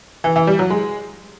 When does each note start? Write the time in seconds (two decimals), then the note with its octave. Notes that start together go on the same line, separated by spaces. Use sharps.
0.24 E3
0.36 E3
0.47 G3
0.59 F#3
0.70 G#3